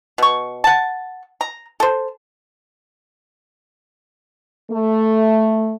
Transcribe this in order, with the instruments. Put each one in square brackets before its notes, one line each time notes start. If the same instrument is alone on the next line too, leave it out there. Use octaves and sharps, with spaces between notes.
[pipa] B2 C#6
F#5 A5
A#5
A4 C5
[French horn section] A3